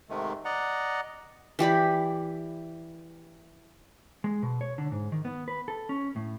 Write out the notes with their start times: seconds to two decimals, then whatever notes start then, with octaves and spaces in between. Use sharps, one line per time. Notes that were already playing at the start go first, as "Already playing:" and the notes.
0.10 G#2 C3 D#3 G#3 A3
0.45 D5 D#5 F#5 A#5
1.59 E3 G4 D5 B5
4.24 G#3
4.43 B2
4.61 C#5
4.78 D3
4.92 G#2
5.12 D#3
5.25 B3
5.48 B4
5.68 A4
5.89 C#4
6.16 A2